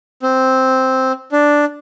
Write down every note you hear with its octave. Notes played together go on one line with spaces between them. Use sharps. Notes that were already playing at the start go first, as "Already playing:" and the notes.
C4
D4